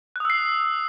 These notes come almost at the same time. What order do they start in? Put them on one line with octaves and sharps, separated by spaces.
F#6 D#6 E6 C7